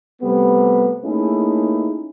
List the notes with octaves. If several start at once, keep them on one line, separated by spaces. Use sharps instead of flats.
C3 G3 A3 B3
A3 A#3 C#4 D#4 E4 G#4